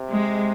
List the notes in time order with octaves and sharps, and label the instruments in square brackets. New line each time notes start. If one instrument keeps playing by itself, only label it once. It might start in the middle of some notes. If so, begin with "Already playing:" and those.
Already playing: [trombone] C3
[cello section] G#3